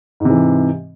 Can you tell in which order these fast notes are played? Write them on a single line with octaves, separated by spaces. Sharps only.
G#2 C3 E3